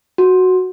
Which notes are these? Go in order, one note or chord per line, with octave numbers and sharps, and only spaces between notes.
F#4